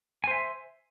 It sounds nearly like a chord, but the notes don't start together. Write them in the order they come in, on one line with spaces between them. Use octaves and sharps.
G#5 C5 E5